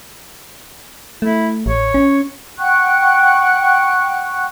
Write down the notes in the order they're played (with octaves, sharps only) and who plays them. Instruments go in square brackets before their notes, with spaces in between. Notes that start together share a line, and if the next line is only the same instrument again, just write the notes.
[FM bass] A3 [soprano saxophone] E4
[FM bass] A1 [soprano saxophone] C#5
[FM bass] C#4
[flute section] F#5 G5 C#6 F#6